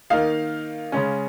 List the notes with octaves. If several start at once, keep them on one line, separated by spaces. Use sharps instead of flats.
D#3 A#3 D#4 F5
C#3 G#3 C#4